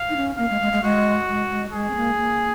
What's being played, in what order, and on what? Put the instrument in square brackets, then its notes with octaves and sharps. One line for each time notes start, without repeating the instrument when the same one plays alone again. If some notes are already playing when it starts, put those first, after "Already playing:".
Already playing: [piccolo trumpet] F5
[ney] D#4
C#4
[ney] A#3 [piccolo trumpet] F5
[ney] G#3
G#3
G#3
[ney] G#3 [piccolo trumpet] F#4
[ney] G#3
G#3
[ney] G#3 [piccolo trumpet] G#4
[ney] C4
A#3
A#3